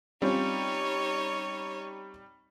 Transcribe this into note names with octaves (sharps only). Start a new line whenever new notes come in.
G3 C4 C#4 D#4 F4 C#5